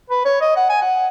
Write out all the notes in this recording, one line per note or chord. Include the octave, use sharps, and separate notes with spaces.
B4
C#5
D#5
F#5
G#5
F#5